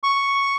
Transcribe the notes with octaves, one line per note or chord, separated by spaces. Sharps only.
C#6